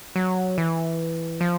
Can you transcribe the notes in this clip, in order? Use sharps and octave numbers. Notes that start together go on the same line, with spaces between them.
F#3
E3
F3